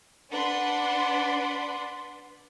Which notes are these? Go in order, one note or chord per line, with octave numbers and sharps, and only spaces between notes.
D4 B4 D5 F#5 B5 C6